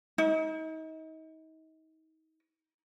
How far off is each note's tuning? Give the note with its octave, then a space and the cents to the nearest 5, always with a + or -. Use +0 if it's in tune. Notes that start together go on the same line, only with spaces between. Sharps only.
D#4 +35